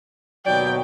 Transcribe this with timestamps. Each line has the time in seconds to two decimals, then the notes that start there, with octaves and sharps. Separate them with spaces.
0.46 D#2 B2 F#3 D5 G5